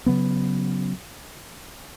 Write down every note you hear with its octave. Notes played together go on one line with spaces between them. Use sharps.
C#3 F#3 B3